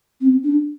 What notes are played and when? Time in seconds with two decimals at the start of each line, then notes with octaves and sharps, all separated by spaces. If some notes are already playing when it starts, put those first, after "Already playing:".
0.21 C4
0.44 D4